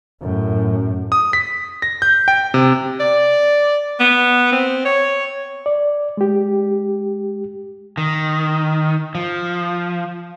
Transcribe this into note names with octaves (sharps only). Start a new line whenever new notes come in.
F#2 A2
D#6
B6
A#6
G6
G5
C3
D5
B3
C4
C#5
D5
G#3 G4
D#3
F3